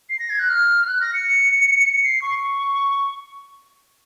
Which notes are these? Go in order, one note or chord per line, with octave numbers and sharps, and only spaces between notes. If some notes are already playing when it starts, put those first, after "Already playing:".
C7
A#6
G#6
F#6
F6
F#6
A#6
C#7
C7
C#6